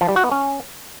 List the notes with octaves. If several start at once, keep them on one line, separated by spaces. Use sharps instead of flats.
F3
G3
F#4
B3
C#4